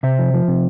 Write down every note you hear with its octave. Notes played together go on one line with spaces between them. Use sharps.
C3 C5 E5
F3
F3
C3